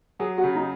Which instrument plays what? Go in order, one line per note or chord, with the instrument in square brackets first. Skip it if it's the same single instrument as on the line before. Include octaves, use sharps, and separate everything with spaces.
[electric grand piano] F#3 [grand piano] G#4
[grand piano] F#4
[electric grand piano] C#3
[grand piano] D#4